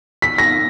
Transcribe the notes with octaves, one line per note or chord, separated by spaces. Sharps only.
B6
A#6